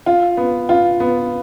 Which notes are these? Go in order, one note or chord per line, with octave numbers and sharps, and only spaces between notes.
F4
B3
F4
B3